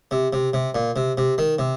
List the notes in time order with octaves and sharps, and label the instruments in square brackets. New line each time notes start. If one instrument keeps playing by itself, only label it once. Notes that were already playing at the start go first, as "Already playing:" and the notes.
[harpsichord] C3
C3
C3
A#2
C3
C3
D#3
C3